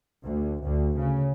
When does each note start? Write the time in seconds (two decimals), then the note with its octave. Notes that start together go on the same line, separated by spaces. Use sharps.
0.24 D2
0.64 D2
0.97 C#3